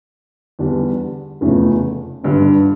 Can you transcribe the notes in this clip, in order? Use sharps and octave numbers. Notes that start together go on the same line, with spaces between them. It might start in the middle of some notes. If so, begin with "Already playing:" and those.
E2 D3 G3 D4
F1 E2 C#3 F3 A3
G1 G2 D3